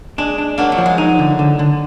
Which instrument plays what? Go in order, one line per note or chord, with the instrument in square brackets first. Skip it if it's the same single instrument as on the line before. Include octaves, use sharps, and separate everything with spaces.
[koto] G#3 [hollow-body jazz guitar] D4
[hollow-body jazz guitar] D4
[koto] F#3 A#3 [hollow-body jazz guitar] D4
[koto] F#3
[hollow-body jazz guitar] F3
[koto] G#3
[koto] F#3 [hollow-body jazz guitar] D#4
[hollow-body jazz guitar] D3
D3
D3